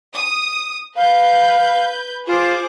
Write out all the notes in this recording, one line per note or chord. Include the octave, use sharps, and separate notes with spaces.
D#6
B4 F5 G6
F4 G#4 C5 D6